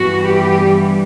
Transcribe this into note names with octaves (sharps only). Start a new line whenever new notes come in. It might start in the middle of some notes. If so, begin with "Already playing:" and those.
Already playing: G2 E3 G3 B3 F#4
G4